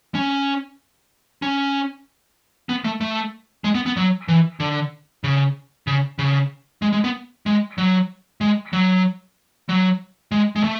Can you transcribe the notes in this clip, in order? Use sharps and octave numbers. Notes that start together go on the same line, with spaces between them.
C#4
C#4
B3
A3
A3
G#3
B3
B3
F#3
E3
D3
C#3
C#3
C#3
G#3
G#3
B3
G#3
F#3
G#3
F#3
F#3
G#3
G#3
A3